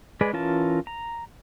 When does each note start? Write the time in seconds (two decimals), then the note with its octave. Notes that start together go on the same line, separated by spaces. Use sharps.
0.21 G#3 G#4 B4 D5
0.33 E3 C#4 F4 A#4 A5
0.87 A#5